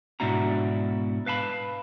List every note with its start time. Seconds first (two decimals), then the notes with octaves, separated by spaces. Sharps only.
0.20 G#2 B2 D4 E4 F#4 A#5
1.26 B4 F5 A5 B5